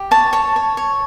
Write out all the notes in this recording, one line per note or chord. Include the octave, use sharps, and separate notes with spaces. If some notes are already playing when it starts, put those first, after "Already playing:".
Already playing: G4
C#5 A5
C#5 A5
C#5
C#5